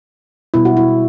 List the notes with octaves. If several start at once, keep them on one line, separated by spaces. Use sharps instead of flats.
B2 G3 E4
F#4
E4